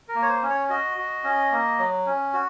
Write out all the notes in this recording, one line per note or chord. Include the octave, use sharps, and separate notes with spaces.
A#4
A#3
C#5
C5
C#4
C#5
F#4 D#5
F#4
C#4
A#3
F#3
C#4
F#4